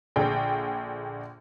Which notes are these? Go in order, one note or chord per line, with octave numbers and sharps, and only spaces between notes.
A#1 D3 G#4 G5